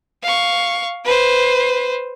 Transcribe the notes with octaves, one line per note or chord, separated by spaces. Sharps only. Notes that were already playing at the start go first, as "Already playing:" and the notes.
F5 C#6
B4 C5